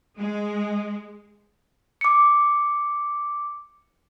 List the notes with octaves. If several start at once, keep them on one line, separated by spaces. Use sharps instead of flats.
G#3
D6 C#7